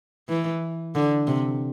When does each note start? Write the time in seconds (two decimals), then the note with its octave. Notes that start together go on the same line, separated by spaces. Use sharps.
0.29 E3
0.95 D3
1.27 C3